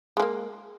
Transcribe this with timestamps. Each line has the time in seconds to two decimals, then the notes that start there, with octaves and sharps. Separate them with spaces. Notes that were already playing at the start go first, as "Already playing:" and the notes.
0.17 G#3
0.20 F3
0.22 A#3